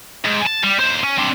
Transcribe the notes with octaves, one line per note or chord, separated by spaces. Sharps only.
G#2
A5
G3
D#2 C5
C#4
C4 D4